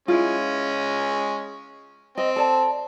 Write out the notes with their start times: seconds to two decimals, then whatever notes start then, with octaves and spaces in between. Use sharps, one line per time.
0.08 G#3 C#4 E4 F4
2.18 C4 D#5
2.36 A4 D5 A5